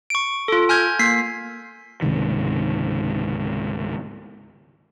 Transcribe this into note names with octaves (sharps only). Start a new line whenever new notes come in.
C#6 D7
F4 A4
G#5 F6 G6 G#6
A#3 B6 C7
C#2 G#2 C3 D#3